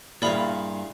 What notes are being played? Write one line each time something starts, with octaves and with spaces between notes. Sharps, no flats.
G2 A#2 E4 G#4 D5 F5 B5